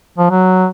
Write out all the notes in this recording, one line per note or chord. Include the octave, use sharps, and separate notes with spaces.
F3
F#3